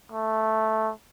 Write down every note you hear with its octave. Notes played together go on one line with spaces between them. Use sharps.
A3